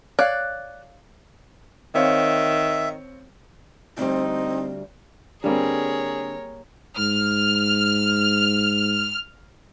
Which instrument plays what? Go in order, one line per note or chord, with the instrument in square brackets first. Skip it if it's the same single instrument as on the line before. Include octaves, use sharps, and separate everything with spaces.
[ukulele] C#5 F5 [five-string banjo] D5 [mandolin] F#6
[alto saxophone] D#3 [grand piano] C4 C#5 F5 [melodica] E5
[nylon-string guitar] D2 G3 [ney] C4 [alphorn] D#4
[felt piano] D3 C4 [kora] G3 A#3 [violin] G#4 [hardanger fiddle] A#4 C#5
[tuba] G#2 [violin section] F6